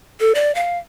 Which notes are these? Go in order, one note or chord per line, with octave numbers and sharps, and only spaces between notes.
A4
D5
F5